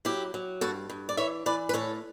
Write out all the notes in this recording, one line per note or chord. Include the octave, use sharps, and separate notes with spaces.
F#3 E4 G4
F#3
G2 F#4 A4
G2
D5
E3 C#5 E5
E3 B4 D5
B4
A2 A4 C#5